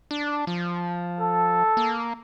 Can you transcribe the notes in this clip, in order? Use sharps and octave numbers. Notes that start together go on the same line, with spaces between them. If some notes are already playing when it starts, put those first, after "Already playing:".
D4
F3
A4
A#3